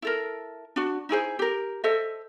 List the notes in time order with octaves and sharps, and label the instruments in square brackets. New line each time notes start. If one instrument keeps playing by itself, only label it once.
[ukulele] E4 A4 A#4
D4 F#4
D#4 E4 G#4 C5
G4 A#4
A4 C5 D#5 E5